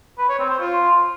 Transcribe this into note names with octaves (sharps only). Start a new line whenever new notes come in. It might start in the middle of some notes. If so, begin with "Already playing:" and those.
B4
C#5
C4
C5
F4